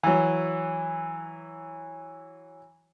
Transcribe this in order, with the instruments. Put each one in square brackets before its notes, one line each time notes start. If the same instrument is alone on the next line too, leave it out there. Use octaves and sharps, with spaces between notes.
[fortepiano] E3 F#3